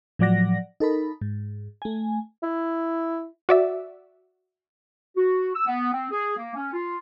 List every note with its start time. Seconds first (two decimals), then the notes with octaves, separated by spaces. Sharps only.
0.19 A2 F3 F#3 D5 F#5 A#6
0.80 D#4 A4 A#4 B5
1.21 G#2
1.82 A3 G#5
2.43 E4
3.49 F#4 D5 E5
5.16 F#4
5.55 E6
5.66 B3
5.93 C4
6.11 G#4
6.37 A#3
6.55 C#4
6.73 F4